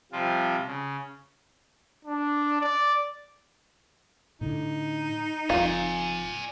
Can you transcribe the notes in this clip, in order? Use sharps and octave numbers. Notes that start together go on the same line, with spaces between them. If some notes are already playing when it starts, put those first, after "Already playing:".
C3 F3 G3 F4
C#3
D4
D5
A2 D3 D#4
F1 F2 F4 D5 G#5